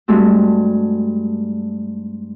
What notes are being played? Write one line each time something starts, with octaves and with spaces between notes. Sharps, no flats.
G2 G#3 A3 C4 F#4